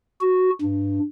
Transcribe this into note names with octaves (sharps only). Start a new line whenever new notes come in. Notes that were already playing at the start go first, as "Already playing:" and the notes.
F#4
G2